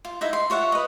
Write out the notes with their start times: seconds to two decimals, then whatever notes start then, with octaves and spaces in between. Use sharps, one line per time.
0.05 F4
0.21 D#4 E4 E5
0.33 C6
0.50 F4 C#5 E5 F#5
0.72 B4 D#5